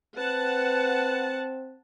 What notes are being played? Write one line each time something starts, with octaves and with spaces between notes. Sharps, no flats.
C4 B4 F#5 A5